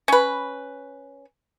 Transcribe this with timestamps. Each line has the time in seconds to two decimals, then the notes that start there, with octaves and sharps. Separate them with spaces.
0.08 C#4 B4